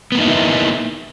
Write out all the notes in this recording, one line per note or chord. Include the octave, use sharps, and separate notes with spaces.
A#3 B3 D#4 E4